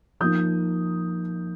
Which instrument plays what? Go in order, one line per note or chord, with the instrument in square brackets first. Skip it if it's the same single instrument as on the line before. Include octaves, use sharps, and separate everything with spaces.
[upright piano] F3 A#3 D#4 D#6 G6